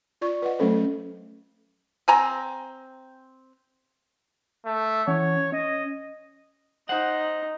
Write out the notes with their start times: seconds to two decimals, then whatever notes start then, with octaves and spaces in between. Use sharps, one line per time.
0.21 F4 D5 C#6
0.42 B4 D#5 F#5
0.59 F#3 A3 C#4 A4 C5
2.08 C4 G#5 A#5
4.65 A3
5.08 E3 C#4 C#5 F#5
5.53 C#4 D#5
6.89 D#4 C5 F#5